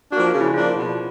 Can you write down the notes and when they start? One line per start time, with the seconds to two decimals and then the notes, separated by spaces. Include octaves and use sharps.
0.12 F3 A#3 D4 F#4
0.26 F4
0.34 C#3
0.41 E4
0.54 F3 A#3 D4 F4
0.77 B2